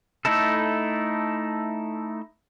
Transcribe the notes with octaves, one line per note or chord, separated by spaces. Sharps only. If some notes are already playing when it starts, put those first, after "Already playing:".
A3 D#4 E4 A4